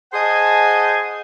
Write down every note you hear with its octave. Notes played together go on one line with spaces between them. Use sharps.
G#4 C5 D#5 F#5 G#5 A5